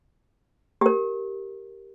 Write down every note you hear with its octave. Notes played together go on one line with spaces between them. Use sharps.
G4 A#4